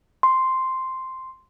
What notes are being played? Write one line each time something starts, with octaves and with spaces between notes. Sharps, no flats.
C6